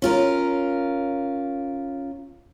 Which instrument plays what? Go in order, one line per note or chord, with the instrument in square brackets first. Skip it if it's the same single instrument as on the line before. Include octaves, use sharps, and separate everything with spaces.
[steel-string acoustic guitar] C#4 F4 A#4